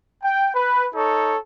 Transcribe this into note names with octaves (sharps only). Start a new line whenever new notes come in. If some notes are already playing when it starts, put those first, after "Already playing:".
G5
B4
D#4 A4 C#5